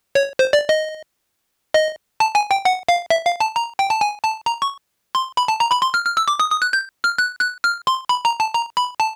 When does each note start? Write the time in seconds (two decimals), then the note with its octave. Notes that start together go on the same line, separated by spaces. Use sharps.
0.15 C#5
0.39 C5
0.53 D5
0.69 D#5
1.74 D#5
2.20 A5
2.35 G#5
2.51 G5
2.65 F#5
2.89 F5
3.10 E5
3.25 F5
3.40 A5
3.56 A#5
3.79 G5
3.90 A5
4.01 G#5
4.24 A5
4.46 A#5
4.62 C#6
5.15 C6
5.37 B5
5.48 A5
5.60 A#5
5.72 B5
5.82 C6
5.94 F6
6.05 F6
6.17 E6
6.28 D6
6.40 D#6
6.50 D#6
6.62 F#6
6.73 G6
7.04 F6
7.18 F#6
7.41 F#6
7.64 F6
7.87 C6
8.09 B5
8.25 A#5
8.40 A5
8.54 A#5
8.77 B5
9.00 A5